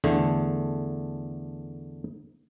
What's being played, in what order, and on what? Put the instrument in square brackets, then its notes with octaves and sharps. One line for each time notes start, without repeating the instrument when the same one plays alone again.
[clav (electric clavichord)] E2 D3 A3